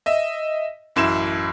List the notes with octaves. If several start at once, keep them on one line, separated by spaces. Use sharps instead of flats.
D#5 E5
A1 F#2 E4 E7